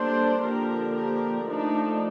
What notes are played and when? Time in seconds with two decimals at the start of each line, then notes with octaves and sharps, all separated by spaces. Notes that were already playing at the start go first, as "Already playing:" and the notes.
Already playing: G3 A#3 D4 A4 C5
0.42 D3 F3 A#3 D4 G4 A#4
0.95 G4 A#4
1.48 F3 A3 D4 D#4